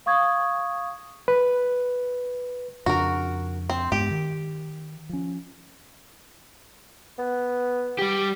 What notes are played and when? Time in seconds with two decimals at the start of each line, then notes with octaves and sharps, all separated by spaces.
0.06 F5 C#6 D#6 G#6
1.28 B4
2.86 F2 C#3 D4 F#4 A#4
3.70 C4
3.92 G2 G#3 B3 G4
4.11 D#3
5.09 F3 C#4
7.18 B3
7.99 G3 G4